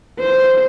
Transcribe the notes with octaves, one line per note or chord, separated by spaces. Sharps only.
C5